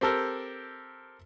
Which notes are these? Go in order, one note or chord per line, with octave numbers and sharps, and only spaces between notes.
C4 G4 A4 A#4